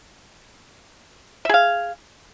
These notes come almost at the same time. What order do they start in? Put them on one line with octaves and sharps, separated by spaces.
E5 G#4 F5